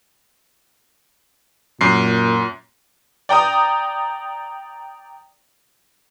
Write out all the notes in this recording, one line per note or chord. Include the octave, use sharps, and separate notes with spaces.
F#2 A#2 C7
D5 G5 A#5 D#6